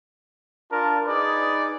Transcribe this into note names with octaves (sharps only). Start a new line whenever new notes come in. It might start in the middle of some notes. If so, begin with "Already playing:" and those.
D4 F4 A#4 A5
D#4 G#4 B4 D5